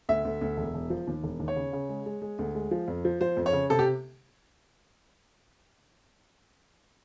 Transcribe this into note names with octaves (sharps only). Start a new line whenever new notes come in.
D2 E5
D2
D2
E1
E1
F3
D#2
E1
D#2
C#5
C#3
C#3
G#3
G#3
G#3
D2
G#3
F3
F2
F3
F3 C5
F2
C#5
C#3
C3 A4
G4